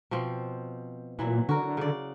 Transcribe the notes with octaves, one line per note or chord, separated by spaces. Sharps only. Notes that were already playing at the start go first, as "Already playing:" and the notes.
B2 F3 C4
A#2 E3 F#3 E4
D3 F#4 A#4
C#3 D5